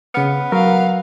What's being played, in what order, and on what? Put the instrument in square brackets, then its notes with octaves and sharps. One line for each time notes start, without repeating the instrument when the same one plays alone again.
[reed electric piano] C#3 F6 [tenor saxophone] B3
[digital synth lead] F#3 [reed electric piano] A#4 [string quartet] F5